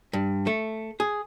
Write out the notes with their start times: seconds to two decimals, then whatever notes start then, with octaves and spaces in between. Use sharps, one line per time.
0.13 G2
0.47 A3
1.00 G#4